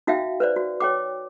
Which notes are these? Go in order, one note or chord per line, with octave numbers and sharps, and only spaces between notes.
D#4 F#4 E5 F5 G5
B4 C5 D5
F#4
C#5 G5 D6